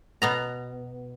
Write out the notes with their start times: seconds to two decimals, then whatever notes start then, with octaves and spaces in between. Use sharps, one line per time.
0.22 B2 B3 A#5